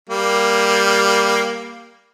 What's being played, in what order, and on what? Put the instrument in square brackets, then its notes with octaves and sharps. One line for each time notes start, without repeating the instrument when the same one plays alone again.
[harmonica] G3 A#3